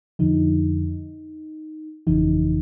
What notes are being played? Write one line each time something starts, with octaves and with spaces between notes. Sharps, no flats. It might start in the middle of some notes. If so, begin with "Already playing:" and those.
F2 D3 F3 D#4
G1 F2 C#3 E3 D#4